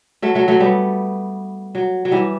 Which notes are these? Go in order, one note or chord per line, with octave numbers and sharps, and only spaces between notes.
F#3 A3
F#3 A3
F#3 A3
G3 B3
F#3
F#3
E3 G3